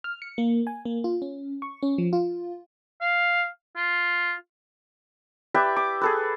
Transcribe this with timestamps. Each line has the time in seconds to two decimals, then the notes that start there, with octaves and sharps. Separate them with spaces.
0.04 F6
0.22 C#7
0.38 A#3
0.67 G#5
0.85 A#3
1.04 F4
1.22 C#4
1.62 C#6
1.82 C#4
1.98 F3
2.13 F4
3.01 F5
3.76 F4
5.54 G4 B4 D5 E5
5.76 D6
6.01 G#4 A4 B4